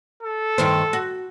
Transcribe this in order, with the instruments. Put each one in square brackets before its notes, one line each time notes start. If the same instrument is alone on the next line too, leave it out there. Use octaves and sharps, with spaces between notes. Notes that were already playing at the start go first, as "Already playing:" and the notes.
[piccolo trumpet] A4
[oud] G2 D#3 C5
F#4